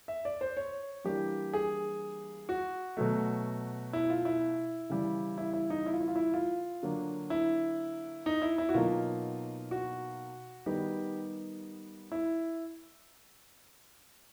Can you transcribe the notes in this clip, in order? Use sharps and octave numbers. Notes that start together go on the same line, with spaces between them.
E5
D5
C5
C#5
E3 G3 A#3 D4 G4
G#4
F#4
B2 F#3 A3
E4
F4
E4
C#3 E3 G3
E4
E4
D#4
E4
F4
E4
F4
E4
F4
D3 F#3 A#3 D4
E4
D#4
E4
E4
F#4
B2 F#3 A#3 D#4 F4
F#4
D#3 G3 B3 D#4 G4
E4